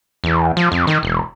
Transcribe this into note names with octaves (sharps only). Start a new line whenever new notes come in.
E2
F3
F2
D#3
E1